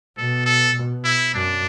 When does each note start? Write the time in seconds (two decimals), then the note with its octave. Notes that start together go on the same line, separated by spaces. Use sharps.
0.18 B2 A4
0.46 A4
0.75 B2
1.04 E4
1.34 F#2 D4